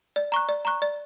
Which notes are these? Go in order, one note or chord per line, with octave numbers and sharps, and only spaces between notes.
D5
A#5 C#6 F#6
D5
A#5 C#6 F#6
D5